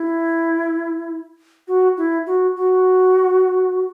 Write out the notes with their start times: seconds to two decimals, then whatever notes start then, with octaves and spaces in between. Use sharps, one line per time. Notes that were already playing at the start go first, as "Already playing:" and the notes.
Already playing: E4
1.68 F#4
1.97 E4
2.27 F#4
2.56 F#4